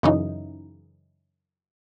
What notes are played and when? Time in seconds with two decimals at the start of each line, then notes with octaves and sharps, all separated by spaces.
0.03 F#2 C#3 E3 D#4